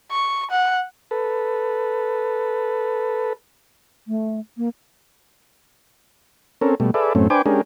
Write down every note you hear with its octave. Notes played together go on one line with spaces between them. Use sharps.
C#6
F#5
A4 B4
A3
A#3
C4 C#4 A4 A#4
B2 G3 A3
G#4 A4 B4 D5 E5
F#2 A2 A3 C4 C#4
D4 B4 C5 G5 G#5 D6
G#3 C#4 D4 G4 G#4 A#4